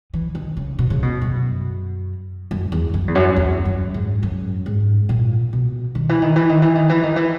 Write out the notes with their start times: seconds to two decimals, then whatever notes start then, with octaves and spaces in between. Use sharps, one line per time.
0.13 E3
0.35 D#3
0.57 C#3
0.79 B2
0.90 C#3
1.02 B2
1.21 F#2
2.51 F#2
2.72 E2
2.94 F#2
3.08 E2
3.15 F#2
3.36 E2
3.65 F#2
3.94 G#2
4.23 F#2
4.66 G#2
5.09 A#2
5.53 B2
5.95 D#3
6.09 E3
6.22 D#3
6.36 E3
6.49 D#3
6.62 E3
6.75 D#3
6.89 E3
7.03 D#3
7.16 E3